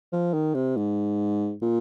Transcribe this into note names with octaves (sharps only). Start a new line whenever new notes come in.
F3
D#3
C3
G#2
A#2